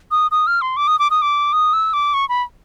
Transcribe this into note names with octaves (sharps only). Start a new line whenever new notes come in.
D#6
D#6
F6
C6
D6
D#6
D6
D#6
D6
D#6
E6
D6
C#6
B5